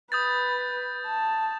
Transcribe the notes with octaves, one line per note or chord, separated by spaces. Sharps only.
B4 D#6 G6 A6
A5